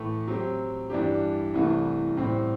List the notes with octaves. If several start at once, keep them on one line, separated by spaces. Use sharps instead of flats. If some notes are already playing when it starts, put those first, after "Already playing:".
Already playing: A2 E3 A3
F#3 C4 G4
G2 E3 G3 D4 G4
C2 C3 E3 A3
A2 G3 C4